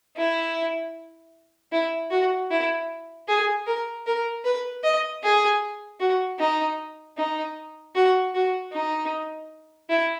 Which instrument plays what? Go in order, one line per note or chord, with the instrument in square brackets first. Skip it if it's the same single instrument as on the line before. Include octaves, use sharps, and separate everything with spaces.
[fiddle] E4
E4
F#4
E4
G#4
A#4
A#4
B4
D#5
G#4
F#4
D#4
D#4
F#4
F#4
D#4
E4